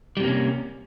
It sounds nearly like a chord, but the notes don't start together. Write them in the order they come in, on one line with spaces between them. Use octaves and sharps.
G3 C3 A#3 C#4